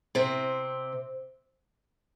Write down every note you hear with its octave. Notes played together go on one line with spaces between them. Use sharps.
C3 C4